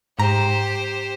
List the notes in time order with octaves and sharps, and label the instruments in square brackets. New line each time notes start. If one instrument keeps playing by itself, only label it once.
[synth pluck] G#2 A#5 [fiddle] G4 C5